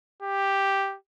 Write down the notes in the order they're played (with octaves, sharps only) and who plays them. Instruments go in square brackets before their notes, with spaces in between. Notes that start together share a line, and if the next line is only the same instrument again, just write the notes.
[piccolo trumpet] G4